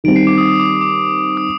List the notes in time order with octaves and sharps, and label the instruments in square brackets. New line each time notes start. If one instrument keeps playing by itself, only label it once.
[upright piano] D#3 G3 C4 [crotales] D7
[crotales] C7
D6
D#6
D#6
D6
D6
D#6